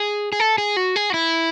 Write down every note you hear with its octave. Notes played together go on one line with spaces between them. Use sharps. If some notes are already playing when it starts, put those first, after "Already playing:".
Already playing: G#4
G#4
A4
G#4
F#4
G#4
F#4
E4